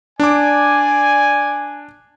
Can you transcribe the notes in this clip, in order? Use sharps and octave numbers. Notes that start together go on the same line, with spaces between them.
D4 D5 G#5 D6